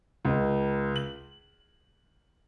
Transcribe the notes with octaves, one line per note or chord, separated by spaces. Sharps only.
C#2
F#7